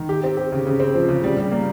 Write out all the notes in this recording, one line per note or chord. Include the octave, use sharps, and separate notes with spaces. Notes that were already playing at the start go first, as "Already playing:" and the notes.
Already playing: D#3
G4
C4
G4
C#3
C#3
C4
F3
C#3
G3
G3
A#3